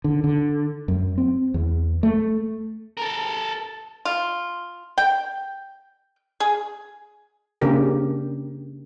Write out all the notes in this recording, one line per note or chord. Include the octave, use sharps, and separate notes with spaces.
D3
D3
F#2
C4
E2
A3
A4 A#4
F4
G5
G#4
C#3 A#3 C4 D4 G4 A#4